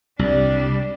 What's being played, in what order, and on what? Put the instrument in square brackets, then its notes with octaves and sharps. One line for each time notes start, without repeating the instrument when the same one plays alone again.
[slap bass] C2 [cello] G3 D4